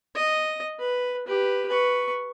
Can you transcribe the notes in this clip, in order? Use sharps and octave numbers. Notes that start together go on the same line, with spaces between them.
D#5
B4
G4 B4
B4 C#6